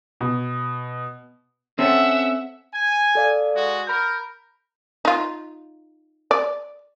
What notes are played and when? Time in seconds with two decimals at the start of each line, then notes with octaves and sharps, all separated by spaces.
0.21 B2
1.79 C4 C#4 A4 E5 F#5
2.72 G#5
3.15 A4 D5 F5
3.54 G#3 F#4
3.87 A#4 B5 G6
5.05 D#4 F4
6.31 D5